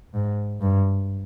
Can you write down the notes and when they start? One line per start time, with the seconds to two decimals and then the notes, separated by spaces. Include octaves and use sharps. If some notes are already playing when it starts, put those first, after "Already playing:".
0.14 G#2
0.61 G2